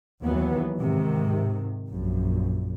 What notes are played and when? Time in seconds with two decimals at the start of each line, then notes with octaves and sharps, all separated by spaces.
0.24 D#2 E3 F#3 B3
0.78 G#2 C3 D#3
1.91 A#1 F#2